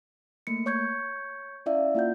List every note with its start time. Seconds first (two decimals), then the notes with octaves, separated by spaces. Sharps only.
0.47 A3 A#3 C#7
0.66 C#5 C#6 G6 G#6 C#7
1.66 C#4 E4 D5 E5 F5
1.95 A#3 E4 F4 F#5 G6